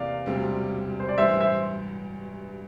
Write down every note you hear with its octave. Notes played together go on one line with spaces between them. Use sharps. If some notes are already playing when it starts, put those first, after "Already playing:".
Already playing: E2 C3 E3 A#3 D5 F5
E1 D2 C3 G3 C4
C5
D5
A1 G2 E3 C5 E5
C5 E5